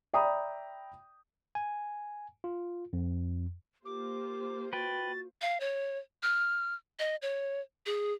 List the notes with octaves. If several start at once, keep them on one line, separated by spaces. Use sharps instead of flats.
D5 E5 G5 A#5 B5 D#6
G#5
F4
F2
A#3 F4 G4 C5 D6
F#4 B4 G5 A6
F5
C#5
F6
D#5
C#5
G#4